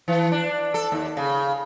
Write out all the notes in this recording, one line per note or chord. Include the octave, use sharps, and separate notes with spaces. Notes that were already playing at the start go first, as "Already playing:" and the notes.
E3
D4
A4
D#2
C#3